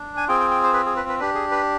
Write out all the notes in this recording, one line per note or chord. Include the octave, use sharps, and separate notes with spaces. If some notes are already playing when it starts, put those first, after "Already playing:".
Already playing: D4
G#5
C4 F4 G#4 G5
G5
G5
C5
B4
G#4
B4
B4
D4 G4 B4
G#4
B4